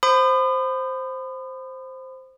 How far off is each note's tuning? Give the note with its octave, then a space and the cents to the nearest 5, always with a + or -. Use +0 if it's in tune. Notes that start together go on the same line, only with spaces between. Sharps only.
C5 +0 B5 +35 D#6 -35